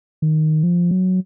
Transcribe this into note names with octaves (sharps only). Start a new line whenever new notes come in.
D#3
F3
F#3